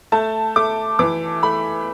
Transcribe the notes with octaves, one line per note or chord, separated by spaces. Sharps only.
A3 A5
A3 D6
E3 D6
A3 B5